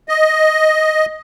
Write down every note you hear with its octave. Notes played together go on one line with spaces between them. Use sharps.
D#5